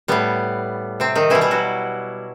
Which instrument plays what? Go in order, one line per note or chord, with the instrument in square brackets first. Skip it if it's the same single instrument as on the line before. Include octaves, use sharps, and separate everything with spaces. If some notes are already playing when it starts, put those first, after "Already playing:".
[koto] A2 G3 B3
C3 C4
D#3 D#4
B2 E3 G3 E4
E3 E4
F#3 F#4